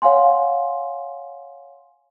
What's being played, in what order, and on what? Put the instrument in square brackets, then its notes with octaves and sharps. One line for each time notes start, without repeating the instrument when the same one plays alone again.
[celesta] C#5 F5 F#5 G#5 C6